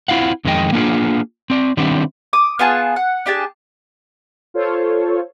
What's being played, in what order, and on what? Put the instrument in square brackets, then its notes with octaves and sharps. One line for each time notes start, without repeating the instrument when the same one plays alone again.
[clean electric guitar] C4 E4 F4 F5 F#5
F2 D#3 G#3 C#4 D#5 G5
A#3 B3 D4 F4 G#4
C4 D5
D#3 G3 B3 C4 D4 E4
[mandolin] D6 D#6
B3 F4 G#4 A5
F#5
D4 G4 G#4 A5
[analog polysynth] F4 A4 C5 C#5